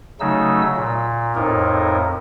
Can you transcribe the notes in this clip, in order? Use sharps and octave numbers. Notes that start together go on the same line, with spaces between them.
C#3 F#3 A3 D#4 E6
A#2
F2 A2 D#4 A#4